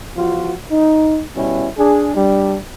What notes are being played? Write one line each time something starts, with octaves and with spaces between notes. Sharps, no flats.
E2 F3 F4 F#4
D#4
B2 G3 C#4 E4
D4 G#4
G3 D4